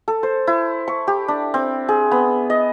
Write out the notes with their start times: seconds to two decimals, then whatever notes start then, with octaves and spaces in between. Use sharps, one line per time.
0.08 A4
0.23 C5
0.47 E4
0.88 C#6
1.08 G4
1.28 D4
1.54 C4
1.89 G#4
2.11 B3
2.50 D#5